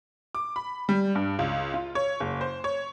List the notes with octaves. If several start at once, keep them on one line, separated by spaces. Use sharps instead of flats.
D6
B5
G3
G2
C#2
F4
C#5
F#1
C5
C#5